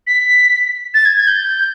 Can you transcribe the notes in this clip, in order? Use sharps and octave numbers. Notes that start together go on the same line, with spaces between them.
B6
A6
G#6
G#6
G6